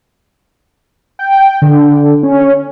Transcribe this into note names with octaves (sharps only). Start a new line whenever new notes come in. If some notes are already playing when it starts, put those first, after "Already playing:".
G5
D3
C#4